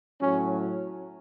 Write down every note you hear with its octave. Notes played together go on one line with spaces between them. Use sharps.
A2 F#3 C#4